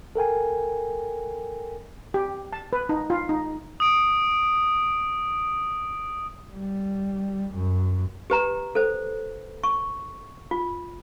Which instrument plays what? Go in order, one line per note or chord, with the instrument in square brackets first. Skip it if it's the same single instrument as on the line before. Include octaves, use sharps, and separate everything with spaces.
[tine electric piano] A4 A#4 G5 G#5
[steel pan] G4
A5
B4
D#4
F4
D#4
[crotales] D#6 D7
[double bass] G3
F#2
[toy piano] G4 B4 A#5
A4 C5
C#6
F4